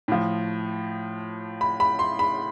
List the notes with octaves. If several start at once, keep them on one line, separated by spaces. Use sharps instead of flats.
A2 F3
B5
B5
C6
B5